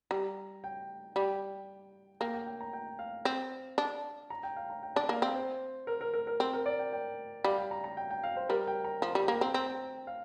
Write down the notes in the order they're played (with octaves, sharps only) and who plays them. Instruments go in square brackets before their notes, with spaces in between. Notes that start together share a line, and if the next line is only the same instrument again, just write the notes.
[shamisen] G3 [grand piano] A#5
[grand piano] G5
[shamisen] G3 [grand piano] G5
[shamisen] A#3 [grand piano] G5
[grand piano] G5
G5
A#5
G5
F5
[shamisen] C4
D4
[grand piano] A#5
G5
F5
A#5
G5
[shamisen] D4 [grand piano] D5
[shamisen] A#3 [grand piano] F5
[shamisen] C4 [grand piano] F5
[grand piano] C5
A#4
A#4
A#4
A#4
[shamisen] C4
[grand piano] A#4
D5
G5
G5
[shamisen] G3 [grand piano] F5
[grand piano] G5
A#5
A#5
G5
G5
F5
C5
[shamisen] G3 [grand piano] A#4
[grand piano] G5
A#5
[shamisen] F3 [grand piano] G5
[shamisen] G3 [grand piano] A#5
[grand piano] G5
[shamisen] A#3
[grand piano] A#5
[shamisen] C4 [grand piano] G5
[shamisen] C4 [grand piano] A#5
[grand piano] G5
F5